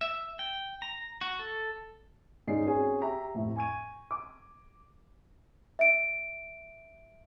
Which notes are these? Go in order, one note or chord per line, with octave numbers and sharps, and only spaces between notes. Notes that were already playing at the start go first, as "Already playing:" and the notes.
E5
G5
A#5
F#4
A4
G#2 G#3 C#4 D#4 D5 C7
C4 C#4 F#4 G#4 G#5
G4 E5 A#5
F2 A2 C3
G#5 C#6 G#6 D#7
D6
E5 D7